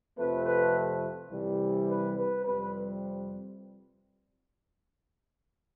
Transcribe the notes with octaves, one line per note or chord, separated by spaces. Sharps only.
F2 C3 F3 A3 C4 B4
B4
C2 C3 E3 G3
B4
B4
F2 C3 G3 C4 B4